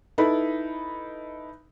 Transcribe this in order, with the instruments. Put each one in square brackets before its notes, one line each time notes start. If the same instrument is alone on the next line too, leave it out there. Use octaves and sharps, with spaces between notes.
[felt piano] D#4 E4 A4 B4 B5